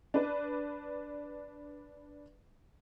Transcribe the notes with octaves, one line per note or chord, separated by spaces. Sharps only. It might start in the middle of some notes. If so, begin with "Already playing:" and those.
D4 B4